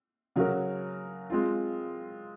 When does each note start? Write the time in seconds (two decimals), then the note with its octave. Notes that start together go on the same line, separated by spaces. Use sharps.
0.36 C#3 F#3 C#4 F#4 A#4
1.30 G#3 C4 F4